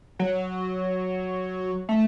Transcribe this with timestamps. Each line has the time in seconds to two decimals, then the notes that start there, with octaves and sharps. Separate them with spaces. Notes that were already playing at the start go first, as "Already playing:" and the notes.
0.19 F#3
1.89 A3